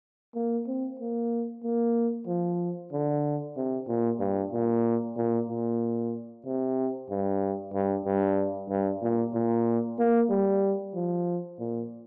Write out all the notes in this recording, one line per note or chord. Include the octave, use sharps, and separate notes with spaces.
A#3
C4
A#3
A#3
F3
D3
C3
A#2
G2
A#2
A#2
A#2
C3
G2
G2
G2
G2
A#2
A#2
A#3
G3
F3
A#2